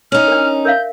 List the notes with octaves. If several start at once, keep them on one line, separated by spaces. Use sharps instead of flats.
C#4 D#4 F6
D4 A#4
A#4 E5 F5 G6